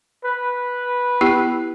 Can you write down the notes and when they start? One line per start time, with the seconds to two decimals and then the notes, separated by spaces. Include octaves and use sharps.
0.25 B4
1.21 B3 E4 G4